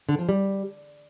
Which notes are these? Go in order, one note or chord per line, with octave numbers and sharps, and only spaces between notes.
D3
F3
G3